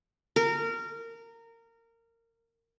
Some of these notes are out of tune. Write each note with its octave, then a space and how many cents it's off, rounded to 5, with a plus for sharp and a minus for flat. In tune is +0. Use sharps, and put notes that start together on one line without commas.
A#4 -20